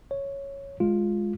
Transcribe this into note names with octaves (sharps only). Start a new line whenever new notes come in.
C#5
G#3 F4